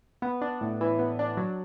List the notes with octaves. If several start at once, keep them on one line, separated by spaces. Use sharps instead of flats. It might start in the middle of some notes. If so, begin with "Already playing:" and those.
B3
D4
A2
E3
B3
D4
F#3